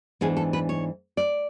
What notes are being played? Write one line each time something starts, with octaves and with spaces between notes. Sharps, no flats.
G#2 E3 B3 D4 G#4
A4
B4
C#5
D5